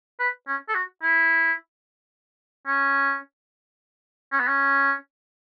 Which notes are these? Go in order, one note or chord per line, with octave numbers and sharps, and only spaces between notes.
B4
C#4
A4
F#4
E4
C#4
C#4
B3
C#4